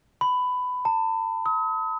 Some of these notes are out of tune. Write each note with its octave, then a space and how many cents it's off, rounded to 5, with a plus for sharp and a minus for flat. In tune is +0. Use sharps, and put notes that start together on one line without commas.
B5 +15
A5 +40
D#6 +40